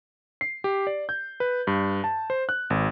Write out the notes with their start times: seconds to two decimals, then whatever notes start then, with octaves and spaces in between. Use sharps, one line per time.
0.41 C7
0.64 G4
0.87 D5
1.09 G6
1.40 B4
1.67 G2
2.04 A5
2.30 C5
2.49 F#6
2.70 G#1